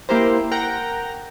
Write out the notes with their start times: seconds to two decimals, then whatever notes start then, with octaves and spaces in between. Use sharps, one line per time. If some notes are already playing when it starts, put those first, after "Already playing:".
0.09 A#3 E4 G4 A#4 C5
0.51 A#4 F#5 G5 A#5